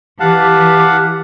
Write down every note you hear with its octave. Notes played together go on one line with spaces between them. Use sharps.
E3 G4 F5 F#5 A5